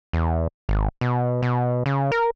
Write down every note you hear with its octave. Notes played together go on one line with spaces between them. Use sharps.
E2
G#1
B2
B2
C#3
A#4